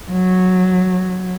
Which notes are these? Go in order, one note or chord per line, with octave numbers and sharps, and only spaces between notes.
F#3